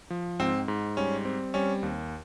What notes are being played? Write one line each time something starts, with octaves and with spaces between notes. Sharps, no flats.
F3
G#2 C4
G#2
G3 C#4
C4
G3 C#4
D#2